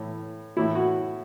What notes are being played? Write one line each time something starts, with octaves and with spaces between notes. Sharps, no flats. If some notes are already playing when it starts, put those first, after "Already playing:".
Already playing: A2 E3
A2 E3 E4
F#4